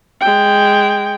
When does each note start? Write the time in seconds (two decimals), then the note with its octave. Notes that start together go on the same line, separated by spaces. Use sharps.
0.21 G#3 G5